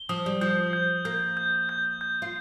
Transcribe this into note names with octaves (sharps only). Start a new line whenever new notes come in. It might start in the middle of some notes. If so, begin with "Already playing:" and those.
Already playing: G7
F3 D#6
G3
F3 G6
G6
A#3 G6
G6
G6
G6
F4